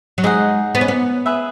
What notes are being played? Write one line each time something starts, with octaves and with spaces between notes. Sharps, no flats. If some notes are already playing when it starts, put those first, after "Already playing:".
F#3
G#3 D#4 G#4 D#5 F#5
B3
C#4
B3
G#4 B4 E5